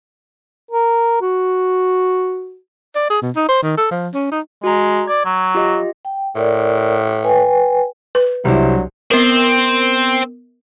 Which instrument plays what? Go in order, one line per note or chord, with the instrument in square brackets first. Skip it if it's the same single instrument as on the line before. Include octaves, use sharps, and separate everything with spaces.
[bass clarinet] A#4
F#4
[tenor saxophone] D5
G#4
B2
D#4
C5
D#3
A4
F3
C#4
D#4
[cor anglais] G#3 [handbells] F#4 A#5
[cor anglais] D5 [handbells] G#6
[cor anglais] F#3
[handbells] F4 G4 D#5
[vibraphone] G5
[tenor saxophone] A2 [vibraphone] A#4 D5
[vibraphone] B4 G5 G#5
[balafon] B4
[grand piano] C2 [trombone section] C3 F#3 D4 [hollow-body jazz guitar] G3 E4
[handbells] B3 A#4 [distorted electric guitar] C4